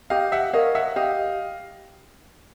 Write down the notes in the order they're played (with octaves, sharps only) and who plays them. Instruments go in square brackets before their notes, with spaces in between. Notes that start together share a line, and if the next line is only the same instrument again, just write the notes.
[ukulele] G4 [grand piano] D#5 F5
[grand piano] E5 F#5
[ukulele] A#4 C#5 [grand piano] D#5 F5
[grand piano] E5 F#5
[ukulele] G4 [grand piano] D#5 F5